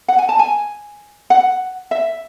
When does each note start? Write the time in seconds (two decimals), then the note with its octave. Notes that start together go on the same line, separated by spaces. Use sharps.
0.08 F#5
0.18 G#5
0.29 A5
0.39 G#5
1.30 F#5
1.91 E5